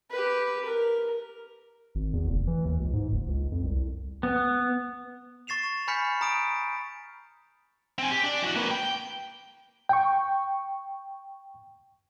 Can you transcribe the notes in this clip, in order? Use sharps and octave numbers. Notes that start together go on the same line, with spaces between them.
G4 B4
A#4
G#1
E2
F1
E3
D#2
C#2
G#2
F#1
C#2
F2
C2
B3
C#6 A6 C7 E7 F7
G#5 B5 F6 G6 B6 C#7
A#5 D#6 D7
C4 G#5
G4
D4
E3 F#4
A#3 B4
G5
G5 C#6